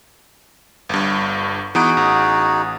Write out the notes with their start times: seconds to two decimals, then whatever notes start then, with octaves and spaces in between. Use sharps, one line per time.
0.89 G1 G2
1.75 E3 B3 D#4 F#4 G#4 D7
1.97 A1